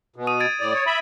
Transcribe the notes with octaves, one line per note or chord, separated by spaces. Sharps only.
B2
D#6 D#7
G#6 A6 D7
A2 D5
C#5
E5 B5